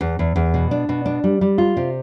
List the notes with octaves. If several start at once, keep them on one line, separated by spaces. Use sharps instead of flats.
E2
E2
E2
B2
D4
B2
D4
G3
G3
F4
C3